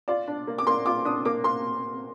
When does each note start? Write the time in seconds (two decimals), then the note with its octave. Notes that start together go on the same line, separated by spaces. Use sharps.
0.08 F4 D5
0.28 D4
0.47 A#3
0.58 D6
0.67 A#3 C6
0.86 F4 D6
1.05 D4 D#6
1.25 A#3 D6
1.44 A#3 C6